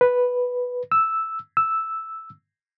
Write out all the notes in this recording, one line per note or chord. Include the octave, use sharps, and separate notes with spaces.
B4
E6
E6